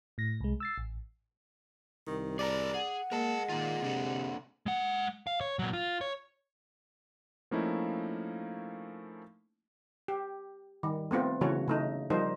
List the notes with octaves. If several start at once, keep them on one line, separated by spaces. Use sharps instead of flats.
A2 A#6
C2 G#3
E6 A6 C7
A1
C2 D#3
G#4 A#4 D5 A#5
G#4 F#5
G#3 A#3 A#4 A5
D#3 A#3 F4
C3 A#3 D4 A4
G#3 F#5
F5
C#5
A#2 F#3
F4
C#5
F3 A3 A#3 C#4 D#4 E4
G4
D#3 G3
A3 B3 C4 F4
C#3 E3 F#3 A3 F#4 C#5
C#3 A3 D#4
F3 G3 D#4 A#4 C5